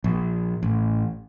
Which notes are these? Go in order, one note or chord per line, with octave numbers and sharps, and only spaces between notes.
A#1
A1